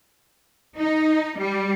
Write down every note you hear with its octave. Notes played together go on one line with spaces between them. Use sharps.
D#4
G3